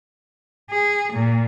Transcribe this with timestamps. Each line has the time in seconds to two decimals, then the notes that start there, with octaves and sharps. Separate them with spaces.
0.71 G#4
1.13 A#2